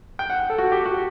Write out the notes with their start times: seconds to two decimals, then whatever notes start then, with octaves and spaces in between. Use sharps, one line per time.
0.19 G5
0.30 F#5
0.50 A4
0.58 F#4
0.72 G4
0.86 F#4